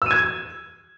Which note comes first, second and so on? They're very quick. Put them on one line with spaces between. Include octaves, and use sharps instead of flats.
E6 D#7 G#6